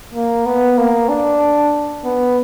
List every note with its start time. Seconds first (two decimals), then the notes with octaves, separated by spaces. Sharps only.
0.14 A#3
0.46 B3
0.78 A#3
1.09 D4
2.05 B3